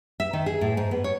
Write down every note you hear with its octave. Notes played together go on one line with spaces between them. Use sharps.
E5
D#3
G#4
A2
G#2
B3
C#5